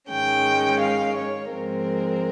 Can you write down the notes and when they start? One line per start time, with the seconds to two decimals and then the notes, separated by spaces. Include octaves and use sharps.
0.10 G#2 D#3 G#3 C#4 G5
0.80 F5
1.15 C#5
1.51 G#2 F3 G#3 C4 A#4